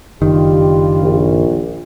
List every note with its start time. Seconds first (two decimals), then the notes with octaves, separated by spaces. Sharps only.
0.21 F#1 G2 D#3 F4 G4
1.01 A#1